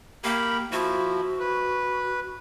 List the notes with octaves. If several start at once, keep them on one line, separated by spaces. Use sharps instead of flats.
A#3 G4 A#4 B5
F3 E4 F#4
B4